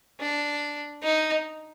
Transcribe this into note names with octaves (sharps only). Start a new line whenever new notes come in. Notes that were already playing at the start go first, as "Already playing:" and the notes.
D4
D#4